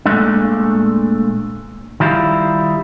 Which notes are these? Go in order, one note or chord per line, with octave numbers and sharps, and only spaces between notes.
A#2 E3 G#3 A3 D4
D#3 G3 E4 F4